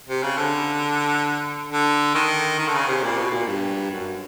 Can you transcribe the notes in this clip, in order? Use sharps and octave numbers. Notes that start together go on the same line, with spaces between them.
C3
C#3
D3
D3
D#3
D#3
D3
C#3
C3
A#2
B2
A#2
G2
F#2